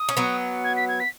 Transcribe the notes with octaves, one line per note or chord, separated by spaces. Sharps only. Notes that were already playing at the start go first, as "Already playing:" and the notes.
Already playing: D#6
C#4
F#3 B3
G#6
B6
G#6
B6